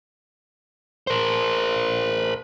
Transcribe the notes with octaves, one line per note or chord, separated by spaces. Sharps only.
A#4 C5